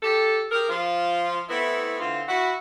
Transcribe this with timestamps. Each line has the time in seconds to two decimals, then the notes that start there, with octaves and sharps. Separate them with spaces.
0.03 G4 A4
0.51 G4 G#4 A#4
0.69 F3 F4
1.49 A3 B3 C4 E4
2.00 D3 E3 C4 F4
2.28 E4 F#4